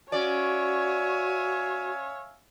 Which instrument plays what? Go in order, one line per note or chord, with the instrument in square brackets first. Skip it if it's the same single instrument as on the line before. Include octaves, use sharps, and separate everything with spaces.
[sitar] C#4 D5 [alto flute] F#4 [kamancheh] C#5 [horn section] E5 F5 G#5